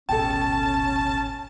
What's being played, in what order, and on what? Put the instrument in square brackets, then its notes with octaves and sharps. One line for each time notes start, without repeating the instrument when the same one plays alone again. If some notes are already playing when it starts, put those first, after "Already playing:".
[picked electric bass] D1 G#1 B2 [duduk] C#4 [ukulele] A4 G5 [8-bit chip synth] A5